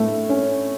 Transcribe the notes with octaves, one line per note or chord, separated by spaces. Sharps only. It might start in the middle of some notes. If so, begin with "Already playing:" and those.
Already playing: A2 A3
C#4